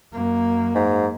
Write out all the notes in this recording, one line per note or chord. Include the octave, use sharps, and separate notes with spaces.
F#2 A#3
G#2